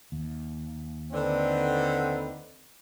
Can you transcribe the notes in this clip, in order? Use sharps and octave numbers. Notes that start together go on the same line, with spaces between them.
D#2
D3 C4 D#4 B4